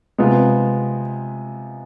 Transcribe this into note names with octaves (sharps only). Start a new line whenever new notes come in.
C3 G#3 B3 F4